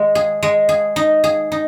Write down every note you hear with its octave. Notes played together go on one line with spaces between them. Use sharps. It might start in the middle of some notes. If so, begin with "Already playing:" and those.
Already playing: G#3
G#4
G#3
G#4
D#4
G#4
D#4